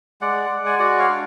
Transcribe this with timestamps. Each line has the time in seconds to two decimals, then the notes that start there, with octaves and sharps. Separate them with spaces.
0.21 G#3 D5 F#5
0.50 G#3
0.66 G#5
0.79 F#4 D5 F#5
0.99 C#5 F5
1.08 D4